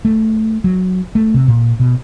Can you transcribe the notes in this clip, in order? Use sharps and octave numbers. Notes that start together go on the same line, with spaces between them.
A3
F#3
A3
C3
A#2
B2